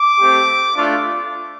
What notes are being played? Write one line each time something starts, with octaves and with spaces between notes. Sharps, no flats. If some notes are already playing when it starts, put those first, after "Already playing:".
Already playing: D6
A3 C4 G4
A3 D4 F4